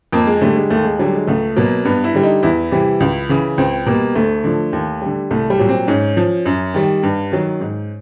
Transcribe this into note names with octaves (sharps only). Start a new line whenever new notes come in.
F2 A#3
G#3
D3 G3 A3
G#3
D#2 A3
G#3
D3 F#3 G3
G#3
C#2 A3
B2 F#3 A#3
G2 B3
E4
D3 G3
D#4
E2 E4
C3 E3 G3
C#2
C#3 E3
C#2 C4
B2 G3 A#3
D2 A3
D3 F3
D#2
D3 G3
C2 A3
G3
A#2 F#3
C4
G#2 C#4
F3
F#2
D#3 G3
G2
D#3 F#3
G#2